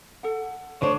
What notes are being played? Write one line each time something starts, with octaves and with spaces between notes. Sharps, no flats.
A4 F#5
D3 A3 D4 C5 C#5